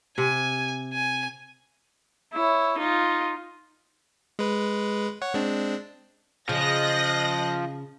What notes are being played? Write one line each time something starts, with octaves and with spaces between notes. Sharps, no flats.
C3 G#5
G#5
E4 C#5
D#4 F4
G#3 B4
C#5 F#5
G#3 C4 D4
C#3 F3 D#5 F#6 A#6